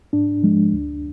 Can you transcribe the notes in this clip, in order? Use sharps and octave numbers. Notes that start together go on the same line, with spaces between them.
G#2 D4
F3 G#3
D2